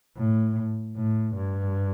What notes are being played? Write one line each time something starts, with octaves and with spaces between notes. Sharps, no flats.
A2
A2
G2